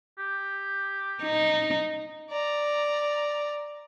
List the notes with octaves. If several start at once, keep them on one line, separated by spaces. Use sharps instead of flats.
G4
D#4
D5 A#5